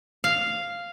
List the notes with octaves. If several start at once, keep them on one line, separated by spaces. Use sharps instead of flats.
F5